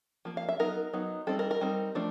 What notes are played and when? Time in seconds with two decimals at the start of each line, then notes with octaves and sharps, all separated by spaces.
0.25 F3 A#3
0.37 F5
0.49 E5
0.59 F#3 B3 D#4 A#4
0.93 F#3 B3 D#4
1.27 G3 C4 D#4 A4
1.39 A#4
1.51 A#4
1.61 G3 C4 D#4
1.95 F3 A3 D4